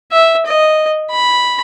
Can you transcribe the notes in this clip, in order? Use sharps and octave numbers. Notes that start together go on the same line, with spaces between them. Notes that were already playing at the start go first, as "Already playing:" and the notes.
E5
D#5
B5